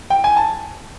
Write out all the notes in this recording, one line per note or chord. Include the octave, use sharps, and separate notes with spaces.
G5
G#5
A5